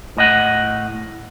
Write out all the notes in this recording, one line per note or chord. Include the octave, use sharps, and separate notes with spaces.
A2 D#5 F#5